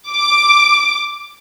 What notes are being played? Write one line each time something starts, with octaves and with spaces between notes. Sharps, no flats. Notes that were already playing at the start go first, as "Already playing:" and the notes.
D6